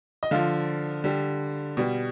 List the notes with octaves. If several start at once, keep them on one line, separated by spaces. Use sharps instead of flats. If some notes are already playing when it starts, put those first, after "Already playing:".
D#5
D3 F3 F5
D3 G3
B2 G3